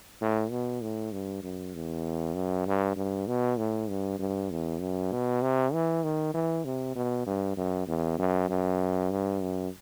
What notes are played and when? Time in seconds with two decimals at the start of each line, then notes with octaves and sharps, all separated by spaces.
0.21 A2
0.51 B2
0.81 A2
1.12 G2
1.43 F#2
1.74 E2
2.35 F#2
2.67 G2
2.96 G2
3.27 B2
3.58 A2
3.89 G2
4.19 G2
4.51 E2
4.80 F#2
5.12 B2
5.42 C3
5.73 E3
6.03 D#3
6.34 E3
6.65 C3
6.95 B2
7.26 G2
7.57 F#2
7.88 E2
8.19 F#2
8.49 F#2
9.10 G2
9.42 F#2